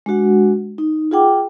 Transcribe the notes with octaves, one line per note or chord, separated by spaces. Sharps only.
G#3 D4 F#4 F#5
D#4
F4 G#4 F#5 G5 D6